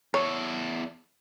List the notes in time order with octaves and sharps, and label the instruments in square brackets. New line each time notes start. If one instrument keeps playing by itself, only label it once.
[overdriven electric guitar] E2 A4 [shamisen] C#5